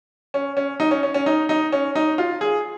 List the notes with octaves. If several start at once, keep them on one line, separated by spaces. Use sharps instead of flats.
C#4
C#4
D#4
C#4
C#4
C#4
D#4
D#4
C#4
D#4
F4
G#4